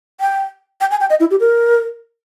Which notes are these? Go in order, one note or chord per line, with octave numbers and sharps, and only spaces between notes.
G5
G5
G#5
G5
D#5
E4
G4
A#4